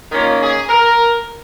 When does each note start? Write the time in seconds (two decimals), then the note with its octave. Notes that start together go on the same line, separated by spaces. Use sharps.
0.12 D#3 A#3 C#4 F4
0.40 G#4
0.69 A#4